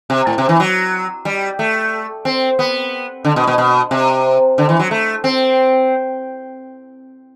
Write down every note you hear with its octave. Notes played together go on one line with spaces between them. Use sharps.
C3
A2
C3
E3
F#3
G3
A3
C4
B3
D3
B2
B2
B2
C3
D3
E3
F#3
A3
C4